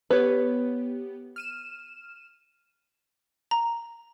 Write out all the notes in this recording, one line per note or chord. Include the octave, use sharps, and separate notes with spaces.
B3 G4 B4 C#5
F6 D#7 E7
A#5